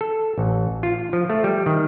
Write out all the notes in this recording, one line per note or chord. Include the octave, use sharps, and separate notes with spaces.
A4
A1
F4
F3
A3
G3
D#3